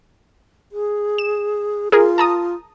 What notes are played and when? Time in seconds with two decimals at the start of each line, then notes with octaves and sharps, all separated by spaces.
0.72 G#4
1.18 E7
1.92 F4 G#4 A#4
2.18 A5 A#5 D#6